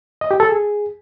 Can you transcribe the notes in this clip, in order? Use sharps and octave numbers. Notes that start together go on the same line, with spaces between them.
D#5
G4
A4
G#4